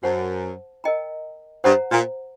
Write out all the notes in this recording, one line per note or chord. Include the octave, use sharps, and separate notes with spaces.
F#2 C5 F#5 A5
A#4 D#5 G5 A#5
G2 C5 F#5 A#5
A#2